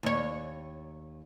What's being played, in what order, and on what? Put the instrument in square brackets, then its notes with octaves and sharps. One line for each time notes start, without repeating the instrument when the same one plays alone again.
[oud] D#2 C#5